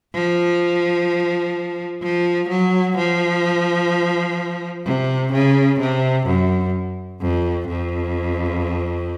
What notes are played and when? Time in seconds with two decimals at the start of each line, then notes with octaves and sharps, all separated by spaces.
0.14 F3
2.03 F3
2.49 F#3
2.97 F3
4.85 C3
5.32 C#3
5.80 C3
6.26 F#2
7.21 F2
7.68 F2